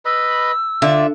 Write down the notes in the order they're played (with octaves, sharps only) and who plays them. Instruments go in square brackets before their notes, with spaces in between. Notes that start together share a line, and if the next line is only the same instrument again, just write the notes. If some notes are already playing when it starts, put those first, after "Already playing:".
[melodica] B4 D#5 B5 [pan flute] E6
[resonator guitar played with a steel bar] D3 [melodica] F4 D5 [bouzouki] E5